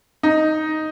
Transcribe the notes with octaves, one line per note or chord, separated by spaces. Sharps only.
D#4